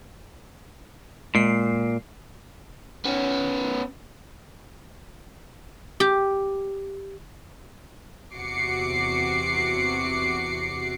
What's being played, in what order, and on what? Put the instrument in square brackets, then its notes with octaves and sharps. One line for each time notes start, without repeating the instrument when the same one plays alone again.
[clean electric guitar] A#2 [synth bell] G#3 C7
[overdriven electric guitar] B3 C#4
[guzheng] G4
[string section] E2 C3 F#4 D6 C7 C#7